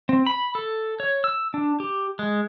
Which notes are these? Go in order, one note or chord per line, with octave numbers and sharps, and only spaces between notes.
C4
B5
A4
C#5
E6
D4
G4
G#3